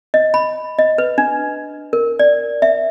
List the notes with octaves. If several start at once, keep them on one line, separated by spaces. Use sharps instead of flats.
D#5
B5
D#5
B4
D4
A#4
D5
E5